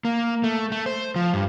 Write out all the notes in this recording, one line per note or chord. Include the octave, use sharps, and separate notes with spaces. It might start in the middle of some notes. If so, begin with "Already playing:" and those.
A#3
A3
A3
C5
F3
G2